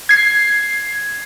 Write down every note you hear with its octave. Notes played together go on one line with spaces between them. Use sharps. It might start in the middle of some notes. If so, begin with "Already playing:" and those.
G#6 C7